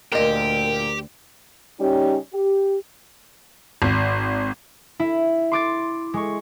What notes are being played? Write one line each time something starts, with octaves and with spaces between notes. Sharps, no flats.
D2 A#2 D3 G4 A#4 D#5
C#3 G3 C#4 D#4 G4
G4
G#1
E4
C6 D6 A6
G#3 C#6